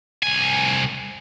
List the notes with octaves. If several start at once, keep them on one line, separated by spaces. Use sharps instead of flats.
C2 G#5